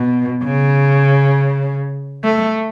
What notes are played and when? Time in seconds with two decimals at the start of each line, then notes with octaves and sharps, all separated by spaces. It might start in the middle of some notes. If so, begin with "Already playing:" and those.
Already playing: B2
0.44 C#3
2.24 A3